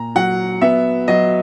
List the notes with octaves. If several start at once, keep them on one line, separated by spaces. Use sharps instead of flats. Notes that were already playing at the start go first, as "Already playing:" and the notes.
Already playing: A#2 A#5
F#3 F#5
B3 E5
F#3 D#5